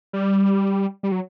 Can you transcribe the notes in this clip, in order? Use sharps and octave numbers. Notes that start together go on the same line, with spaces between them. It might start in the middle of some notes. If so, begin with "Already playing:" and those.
G3
G3
F#3